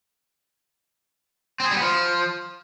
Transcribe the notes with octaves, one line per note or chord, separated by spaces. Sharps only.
C4
G#4
G3
B3
F3